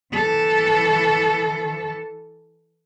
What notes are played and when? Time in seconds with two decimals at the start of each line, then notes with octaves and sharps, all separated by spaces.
0.13 E3 A4